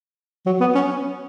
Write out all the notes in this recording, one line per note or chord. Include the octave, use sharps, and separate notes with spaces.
F#3
B3
C#4